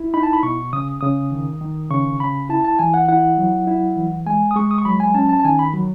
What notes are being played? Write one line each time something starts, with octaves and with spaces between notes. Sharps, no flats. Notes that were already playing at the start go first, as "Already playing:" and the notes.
Already playing: E4
D#4 B5
A5
B5
B2 C#6
C#3 D#6
C#3 D#6
D#3
D#3
C#3 C#6
C#3 B5
E4 A5
A5
E3 G#5
F#5
E4 F#5
F#3
E4
E3
G#3 G#5
D#6
G#3 C#6
D#6
C#6
F#3 B5
G#5
C#4 A5
A5
A5
D#3 G#5
B5
F#3